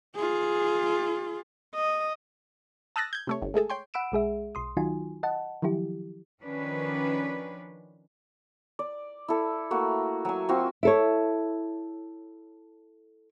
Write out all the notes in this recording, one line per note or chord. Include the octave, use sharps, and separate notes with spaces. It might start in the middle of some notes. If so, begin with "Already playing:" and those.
F4 G#4
D#5
A5 D#6 E6 F#6 A6 A#6
G6 G#6
C3 A3 C#5
G1
G#3 A3 G#4 A4
C#5 G5 C6
F#5 B5 E6 D7 E7
B1 G#3 G#4 E5
B1 C6 D#6
D#3 F#3 D#4 F4 F#4 G#5
D#5 F#5 A5
D#3 F3 F#3 E4 G4
D#3 F3 C#4 D4 B4
D5
E4 A4
A3 A#3 F#4
F#3 G#5
C4 F4 F#4
E4 A4 C#5